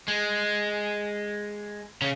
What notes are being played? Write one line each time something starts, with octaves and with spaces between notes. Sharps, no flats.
G#3
C#3